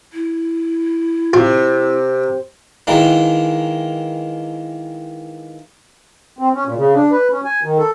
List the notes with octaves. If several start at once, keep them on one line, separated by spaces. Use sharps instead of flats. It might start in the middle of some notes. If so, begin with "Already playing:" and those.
E4
C3 F4
D#3 E3 G#3 A#3
C4
C#4
A#2
C#3
D4
B4
C#4
G#5
D#3
A4